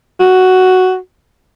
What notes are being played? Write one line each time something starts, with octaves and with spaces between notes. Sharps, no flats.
F#4